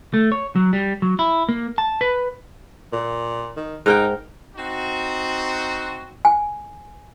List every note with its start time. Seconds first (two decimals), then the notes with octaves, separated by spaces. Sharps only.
0.14 A3
0.32 C#5
0.56 F#3
0.73 G3
1.02 F#3
1.19 E4
1.49 A#3
1.78 A5
2.01 B4
2.93 A#2
3.57 D#3
3.86 G#2 D#4 A#4 G5
4.56 C4 D#4 F#4
6.25 G#5